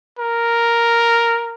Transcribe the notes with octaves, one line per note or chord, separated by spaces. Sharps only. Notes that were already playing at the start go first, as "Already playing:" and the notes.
A#4